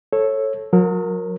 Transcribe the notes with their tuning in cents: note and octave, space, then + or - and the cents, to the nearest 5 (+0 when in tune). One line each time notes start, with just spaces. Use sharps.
A4 +0 C#5 -20
F#3 -35 A#4 +0